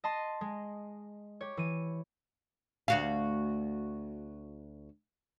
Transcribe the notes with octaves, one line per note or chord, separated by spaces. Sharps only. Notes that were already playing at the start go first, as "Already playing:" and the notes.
D#5 A5 C6
G#3
G4 C#5
E3 D#7
D2 F#4 F5